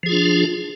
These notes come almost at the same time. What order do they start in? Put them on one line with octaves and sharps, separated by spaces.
F3 G#4 F4 D4